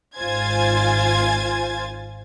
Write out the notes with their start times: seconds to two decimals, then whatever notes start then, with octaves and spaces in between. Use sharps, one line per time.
0.17 G#1 F4 C5 G#5 G#6 A6